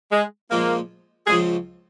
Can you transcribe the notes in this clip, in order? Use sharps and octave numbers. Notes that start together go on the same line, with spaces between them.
G#3
A#2 F3 G#3 A#3
C#2 C#3 F3 G#4